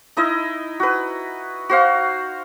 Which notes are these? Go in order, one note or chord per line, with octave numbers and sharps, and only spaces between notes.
D#4 E4 D#5
F#4 B4
F#4 C5 F5